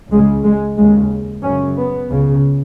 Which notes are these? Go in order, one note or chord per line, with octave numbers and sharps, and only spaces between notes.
C#2 C#3 G#3
G#3
D#2 C#3 G#3
F#2 C#3 C#4
B3
C#2 C#3